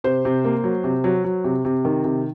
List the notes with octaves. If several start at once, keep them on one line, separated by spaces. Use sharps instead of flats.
C3 C5
C3
A#3
F#3
C3
F#3
F#3
C3
C3
D#3
C3